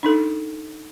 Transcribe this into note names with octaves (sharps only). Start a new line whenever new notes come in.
D4 D#4 A4